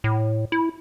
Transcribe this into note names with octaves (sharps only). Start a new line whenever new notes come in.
A2
E4